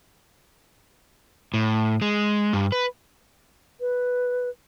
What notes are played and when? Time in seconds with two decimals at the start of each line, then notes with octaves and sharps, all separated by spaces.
1.54 A2
2.02 G#3
2.53 G2
2.72 B4
3.81 B4